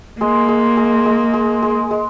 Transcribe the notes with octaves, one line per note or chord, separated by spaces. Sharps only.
G#3 A#3
G#3
G#3
G#3
G#3
G#3
G#3